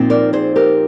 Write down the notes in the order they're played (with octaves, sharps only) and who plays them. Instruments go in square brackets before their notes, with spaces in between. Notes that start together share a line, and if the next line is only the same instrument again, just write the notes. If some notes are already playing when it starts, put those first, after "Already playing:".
Already playing: [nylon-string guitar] A#2 F3 C4 D#4
A#4 D5
G#4 C5
G4 A#4